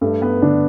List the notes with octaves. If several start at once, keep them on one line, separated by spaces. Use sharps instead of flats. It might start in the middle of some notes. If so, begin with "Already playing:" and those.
G2 A3
B3
D3 D4